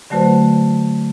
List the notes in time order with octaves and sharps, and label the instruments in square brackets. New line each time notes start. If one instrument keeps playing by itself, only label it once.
[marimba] D3 F#3 A3 F#4 B4 C5